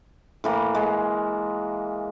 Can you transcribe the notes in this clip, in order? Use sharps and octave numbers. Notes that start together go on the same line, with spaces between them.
A2 E3 A#3
G#3